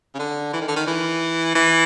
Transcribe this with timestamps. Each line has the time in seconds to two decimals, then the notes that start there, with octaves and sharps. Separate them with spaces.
0.15 C#3
0.19 D3
0.53 E3
0.61 D#3
0.68 D3
0.76 D#3
0.87 E3
1.55 E3